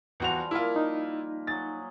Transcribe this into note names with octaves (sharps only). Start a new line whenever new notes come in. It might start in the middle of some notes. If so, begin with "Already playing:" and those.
E2 F3 G3 F#4 F7
A#3 E4 F4
D#4
F#3 G#4 A6